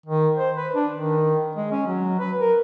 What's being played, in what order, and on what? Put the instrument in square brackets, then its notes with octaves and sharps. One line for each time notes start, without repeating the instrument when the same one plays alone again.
[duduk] D#3
C5
B4
D4
D#3
G#3
C#4
F#3
B4
A#4